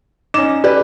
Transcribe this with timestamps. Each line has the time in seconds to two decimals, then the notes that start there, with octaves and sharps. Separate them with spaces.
0.34 C#4 D#4 D6 E7
0.64 G4 B4 D5